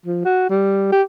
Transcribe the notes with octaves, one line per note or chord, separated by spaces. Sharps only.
F3
F#4
G3
G4